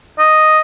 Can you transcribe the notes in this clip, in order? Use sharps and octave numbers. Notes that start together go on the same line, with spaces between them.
D#5